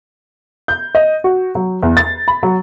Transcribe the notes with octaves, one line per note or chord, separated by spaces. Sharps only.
G6
D#5
F#4
F#3
E2
A6
B5
F#3